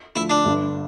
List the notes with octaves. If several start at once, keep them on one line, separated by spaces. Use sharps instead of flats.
D2 D3 F3 E4
D4
G1 G2 D3